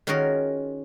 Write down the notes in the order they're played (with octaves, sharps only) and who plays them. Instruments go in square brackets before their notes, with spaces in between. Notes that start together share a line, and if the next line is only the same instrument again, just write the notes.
[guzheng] D#3 C#4 F4 F#4 G#4 A#4